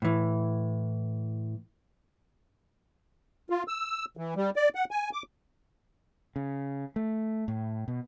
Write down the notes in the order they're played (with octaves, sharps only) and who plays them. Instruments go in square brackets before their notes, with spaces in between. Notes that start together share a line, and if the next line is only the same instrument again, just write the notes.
[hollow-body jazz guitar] A2 E3
[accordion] F4
E6
E3
G3
D5
F#5
G#5
D6
[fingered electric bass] C#3
A3
A2
B2